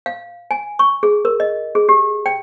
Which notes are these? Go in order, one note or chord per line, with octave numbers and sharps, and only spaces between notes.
F5
G#5
C#6
G#4
A#4
D#5
G#4
G4
G5